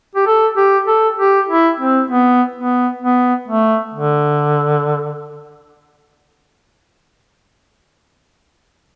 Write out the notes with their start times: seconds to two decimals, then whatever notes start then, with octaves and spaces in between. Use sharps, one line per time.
0.15 G4
0.26 A4
0.57 G4
0.87 A4
1.19 G4
1.49 E4
1.80 C4
2.10 B3
2.56 B3
3.02 B3
3.48 A3
3.94 D3